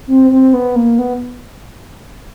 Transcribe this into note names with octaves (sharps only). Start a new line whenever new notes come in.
C4
C4
B3
A#3
B3